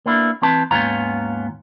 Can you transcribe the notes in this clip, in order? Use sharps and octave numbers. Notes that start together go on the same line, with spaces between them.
A#3 B3 D4 E4
E3 C4 B4 A5
D#2 G#2 B3 C#4 F4 A#5